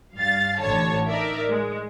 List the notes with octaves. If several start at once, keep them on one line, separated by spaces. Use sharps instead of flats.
G2 F5 A6
A1 D3 C#5 A5
D#4 A#4 D5 E5
G#3